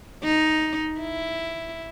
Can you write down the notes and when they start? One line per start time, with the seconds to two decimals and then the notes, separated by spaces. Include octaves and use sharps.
0.23 D#4
1.01 E4